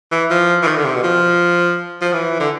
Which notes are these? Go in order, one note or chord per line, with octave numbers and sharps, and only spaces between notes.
E3
F3
E3
D#3
D3
C3
B2
F3
F3
E3
D3